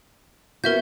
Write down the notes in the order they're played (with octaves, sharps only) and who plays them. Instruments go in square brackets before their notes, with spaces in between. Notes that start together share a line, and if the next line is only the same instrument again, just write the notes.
[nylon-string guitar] B3 F#4 [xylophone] A#4 E5 G6